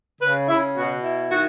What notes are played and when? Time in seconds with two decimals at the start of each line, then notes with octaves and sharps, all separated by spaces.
0.21 C#3 B4
0.48 C#3 E4
0.76 B2 F#4
1.03 E4
1.31 D#3 F#4